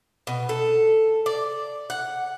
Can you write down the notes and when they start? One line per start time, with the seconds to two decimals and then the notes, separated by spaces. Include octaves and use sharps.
0.27 B2
0.49 A4
1.26 D5
1.90 F#5